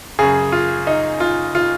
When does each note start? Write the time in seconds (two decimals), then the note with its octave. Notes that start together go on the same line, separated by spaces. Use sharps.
0.19 F#2 C#3 G#4
0.52 F4
0.87 D#4
1.20 F4
1.55 F4